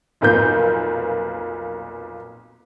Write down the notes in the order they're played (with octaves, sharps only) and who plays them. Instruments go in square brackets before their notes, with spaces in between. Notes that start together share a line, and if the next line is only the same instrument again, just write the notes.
[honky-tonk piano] F1 B1 A#2 A#3 B4 G6